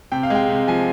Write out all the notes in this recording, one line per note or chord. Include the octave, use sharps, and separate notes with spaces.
C3 G5
F5
G#3 G5
C3
F3 G#5